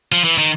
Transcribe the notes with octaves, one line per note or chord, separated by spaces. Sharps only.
F3
E3
D#3